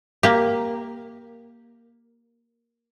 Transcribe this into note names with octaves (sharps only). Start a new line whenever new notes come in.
A#3 G4